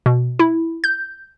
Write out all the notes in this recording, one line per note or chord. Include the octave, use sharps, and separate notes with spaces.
B2
E4
G6